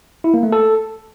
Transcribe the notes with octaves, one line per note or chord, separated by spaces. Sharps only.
E4
A#3
A3
A4